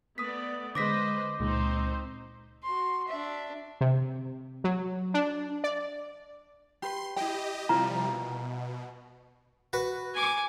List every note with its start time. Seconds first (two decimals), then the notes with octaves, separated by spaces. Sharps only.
0.18 A3 B3 D5 D#6 B6
0.75 D3 G#3 B4 C5 D#5 D6 A#6 B6
1.40 C#2 A#2 G#3 C4 D#4 C5
2.63 F#4 C6
3.08 D4 E5
3.81 C3
4.64 F#3
5.14 D4
5.64 D5
6.82 G4 B4 C6
7.16 E4 G4 D#5 G5
7.69 C3 F3 G3 E4 F4 A#4 A#5
8.07 B2
9.73 F#4 B4
10.14 G#5 D6